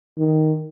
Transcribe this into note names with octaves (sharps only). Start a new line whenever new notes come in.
D#3